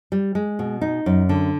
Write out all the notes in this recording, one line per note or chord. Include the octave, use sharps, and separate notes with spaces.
G3
G#3
B2
D#4
F#2
D3